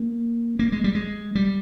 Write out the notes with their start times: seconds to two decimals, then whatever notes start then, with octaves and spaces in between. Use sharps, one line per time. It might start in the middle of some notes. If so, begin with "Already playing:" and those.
Already playing: A#3
0.59 A#3
0.72 G#3
0.84 G3
0.95 G#3
1.35 G3